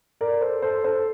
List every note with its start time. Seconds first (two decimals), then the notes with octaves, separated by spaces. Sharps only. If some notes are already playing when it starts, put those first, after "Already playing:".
0.21 A#4 D5
0.41 A4 C5
0.62 A4 C5
0.84 A4 C5